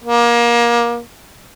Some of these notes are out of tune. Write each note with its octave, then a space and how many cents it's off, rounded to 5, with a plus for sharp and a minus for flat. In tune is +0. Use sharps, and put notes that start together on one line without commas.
A#3 +25